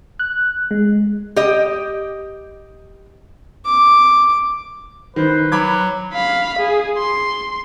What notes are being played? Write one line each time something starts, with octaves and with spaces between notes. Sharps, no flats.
F#6
G#3
G4 D#5
D6
D#3 B4 C5
F#3 B5 D6 G#6
F5 B5
G#4
C6